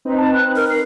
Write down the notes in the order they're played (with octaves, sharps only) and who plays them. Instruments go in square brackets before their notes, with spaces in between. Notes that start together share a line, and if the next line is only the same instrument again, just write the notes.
[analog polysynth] C4 D#4 B4
[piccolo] A5
F#6
[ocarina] A#4 [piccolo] F6
[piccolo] C7